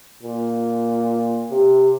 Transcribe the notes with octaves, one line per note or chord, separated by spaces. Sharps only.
A#2
C3